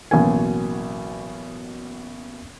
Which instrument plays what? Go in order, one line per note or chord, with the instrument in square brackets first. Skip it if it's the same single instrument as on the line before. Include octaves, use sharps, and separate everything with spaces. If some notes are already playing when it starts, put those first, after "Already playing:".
[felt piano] A1 B2 F#3 A#3 G#5